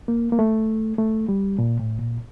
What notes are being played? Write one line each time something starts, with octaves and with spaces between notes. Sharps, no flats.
A#3
A#3
A3
A3
G3
A#2
A2
A#2